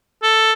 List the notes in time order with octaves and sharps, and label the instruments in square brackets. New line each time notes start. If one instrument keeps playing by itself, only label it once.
[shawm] A4